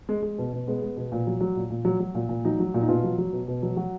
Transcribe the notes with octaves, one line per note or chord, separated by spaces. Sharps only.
G#3
G#3
B2
B2
G#3 B3
G#3
B2
A#2
F#3
F#3
A#2
A#2
F#3
F#3
A#2
A#2
F#3 D#4
F#3
A#2
D#4
B2 F4
F#3
F#3
B2
B2
F#3
F#3 F#4